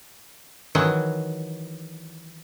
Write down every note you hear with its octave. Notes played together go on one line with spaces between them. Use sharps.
D#3 E3 F#3